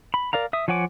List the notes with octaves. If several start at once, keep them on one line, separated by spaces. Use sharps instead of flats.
B5
A#4 D5 F5 A#5
E5 D#6
F3 C#5 F#5 G#5 D6